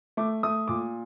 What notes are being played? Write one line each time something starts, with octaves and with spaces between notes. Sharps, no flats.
A3 D6
A3 D#6
A#2 D6